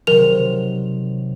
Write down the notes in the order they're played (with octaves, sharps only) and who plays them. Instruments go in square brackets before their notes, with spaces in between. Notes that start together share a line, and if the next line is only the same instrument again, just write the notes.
[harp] C3 D#3 F#3 [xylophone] A#4 F7